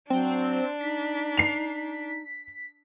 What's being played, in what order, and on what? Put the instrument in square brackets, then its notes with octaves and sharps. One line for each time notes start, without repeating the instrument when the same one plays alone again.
[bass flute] F#3 [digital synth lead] C4 [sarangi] D4
[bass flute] D#4 [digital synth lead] B6
[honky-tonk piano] C7 F7